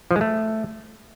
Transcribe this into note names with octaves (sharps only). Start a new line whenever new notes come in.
F3
G#3
A3